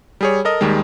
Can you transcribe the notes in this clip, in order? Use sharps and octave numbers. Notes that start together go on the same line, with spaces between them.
G3 G#4 C#5
A4 A#4 D#5
D#2 D#3 G3 G#3